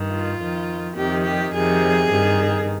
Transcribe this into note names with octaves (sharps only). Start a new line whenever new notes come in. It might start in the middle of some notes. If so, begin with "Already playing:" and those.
Already playing: G2 D#3
F4
F2 D#3
F2 C3 D#3 G4
G4
F2 C3 D#3 G#4
G2 D#3